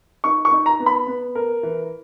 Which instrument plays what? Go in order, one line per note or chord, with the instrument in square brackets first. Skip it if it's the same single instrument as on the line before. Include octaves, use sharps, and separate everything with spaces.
[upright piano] D#4 [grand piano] C#6
[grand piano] C#6
[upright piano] D#4
[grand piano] A#5
[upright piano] B3
[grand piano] B5
[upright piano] B3
A#4
E3